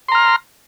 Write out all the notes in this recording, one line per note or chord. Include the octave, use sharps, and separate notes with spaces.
A#5 C6 F6